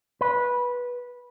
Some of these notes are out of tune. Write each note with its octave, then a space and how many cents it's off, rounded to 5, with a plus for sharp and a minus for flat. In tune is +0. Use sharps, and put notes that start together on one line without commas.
B4 -15